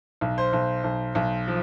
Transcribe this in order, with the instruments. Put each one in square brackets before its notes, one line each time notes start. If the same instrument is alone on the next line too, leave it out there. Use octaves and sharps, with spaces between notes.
[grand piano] B1
C5
B1
B1
B1
F3